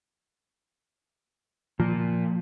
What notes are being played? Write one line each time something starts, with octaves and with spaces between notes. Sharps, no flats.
A#2 F3